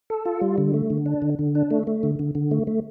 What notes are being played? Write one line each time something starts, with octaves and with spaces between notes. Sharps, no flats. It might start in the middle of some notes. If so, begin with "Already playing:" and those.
A4
F4
G3
D3
A3
D3
D4
D3
D3
D4
A3
A3
D3
D3
D3
A3
A3